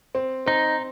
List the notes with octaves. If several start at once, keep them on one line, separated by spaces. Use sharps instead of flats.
C4
C4 D#4